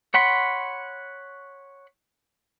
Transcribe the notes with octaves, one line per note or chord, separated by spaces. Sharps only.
C#5 F#5 B5 C6